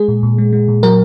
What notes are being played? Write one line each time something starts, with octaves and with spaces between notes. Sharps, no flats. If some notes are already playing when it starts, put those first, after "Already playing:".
Already playing: G#3 G#4
A#2
A#2
G#3
G#3
A#2
F#3 A#4